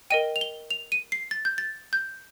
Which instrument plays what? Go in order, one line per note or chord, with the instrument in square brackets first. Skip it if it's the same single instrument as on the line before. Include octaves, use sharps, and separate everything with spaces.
[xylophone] A#4 D#5 G5 D#7
F7
G7
F7
D#7
C7
A6
G6
A6
G6